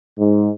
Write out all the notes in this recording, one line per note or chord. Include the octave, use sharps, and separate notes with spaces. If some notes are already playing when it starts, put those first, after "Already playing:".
G#2